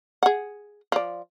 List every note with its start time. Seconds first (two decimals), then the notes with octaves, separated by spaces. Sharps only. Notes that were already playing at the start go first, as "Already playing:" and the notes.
0.23 G#4 F#5
0.92 F3 D5